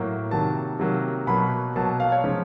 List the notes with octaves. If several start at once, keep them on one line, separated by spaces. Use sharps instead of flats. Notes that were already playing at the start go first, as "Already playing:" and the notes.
Already playing: A2 F#3 A#3
C3 D#3 F#3 A#3 A5
C3 D#3 F#3 A#3
B2 F#3 A#3 B5
B2 F#3 A#3 A5
F5
C#5
C#3 F3 G#3